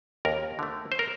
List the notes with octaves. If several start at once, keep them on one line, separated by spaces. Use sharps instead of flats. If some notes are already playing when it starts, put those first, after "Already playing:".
D#2 A#4
D3 A3
C5
A#4